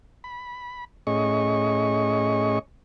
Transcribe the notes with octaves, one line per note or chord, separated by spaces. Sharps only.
B5
A2 C#4 G#4 D#5 C#6